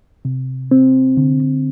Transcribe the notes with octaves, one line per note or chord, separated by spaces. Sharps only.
C3
C4
D3